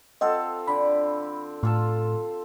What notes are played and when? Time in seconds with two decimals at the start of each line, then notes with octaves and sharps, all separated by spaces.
0.21 C4 F4 A4 D#5 F#5
0.67 D3 D5 B5
1.63 A2 F4 A4 A5